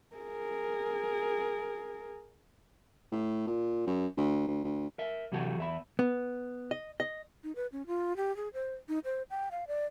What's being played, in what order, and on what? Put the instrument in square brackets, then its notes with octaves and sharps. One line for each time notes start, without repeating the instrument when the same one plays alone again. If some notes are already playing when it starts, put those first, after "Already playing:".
[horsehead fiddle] G#4 A#4
[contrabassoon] A2
A#2
F#2
D2
D2
D2
[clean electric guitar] A#4 E5
C3 E3 F#3 F#4 G4 A4
E2 E5 B5
[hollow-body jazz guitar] B3
D#5
D#5
[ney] D#4
B4
C#4
F4
G4
G#4
C5
D#4
C5
G5
F5
D5